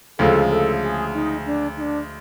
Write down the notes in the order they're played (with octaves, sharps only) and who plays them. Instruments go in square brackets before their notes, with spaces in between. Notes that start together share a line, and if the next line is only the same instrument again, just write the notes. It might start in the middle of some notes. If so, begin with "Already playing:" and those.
[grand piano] D2 C#3 F3 G#3 [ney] A4
[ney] A4
G#4
D#4
D4
D#4
D4